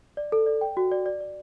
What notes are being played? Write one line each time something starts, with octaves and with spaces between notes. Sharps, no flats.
D5
A4
D5
G5
F#4
D5
D5
D5